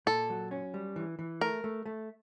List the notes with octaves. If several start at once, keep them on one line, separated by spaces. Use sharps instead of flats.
A#2 A4
F#3
C#4
G3
E3
E3
A3 A#4
A3
A3